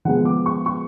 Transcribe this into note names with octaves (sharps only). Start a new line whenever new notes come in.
F3 G#3 B3 F#5
D6
C#6
C#6